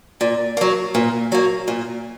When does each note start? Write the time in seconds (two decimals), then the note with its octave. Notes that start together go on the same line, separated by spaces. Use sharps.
0.21 A#2
0.57 F#3 A#3
0.95 A#2
1.32 F#3 A#3
1.68 A#2